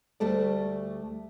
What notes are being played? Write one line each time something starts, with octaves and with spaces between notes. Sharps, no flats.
D2 G3 A3 A4 D5